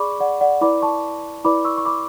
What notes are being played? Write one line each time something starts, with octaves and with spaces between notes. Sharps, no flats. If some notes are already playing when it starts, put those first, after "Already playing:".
Already playing: G#4 D5 B5 C#6 D6
D5 F#5
D5 F#5
E4 B4 D5 B5 D6
A5 C#6
E4 B4 D5 B5 D6
C#6 E6
C#6
B5 D6